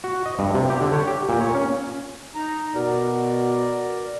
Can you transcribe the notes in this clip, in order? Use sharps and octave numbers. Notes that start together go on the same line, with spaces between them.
F#4
D#5
G2
C3
G4
D3
C#5
G4
A#2
C#5
C#4
D#4 A#5
B2 F#4 A#4 D5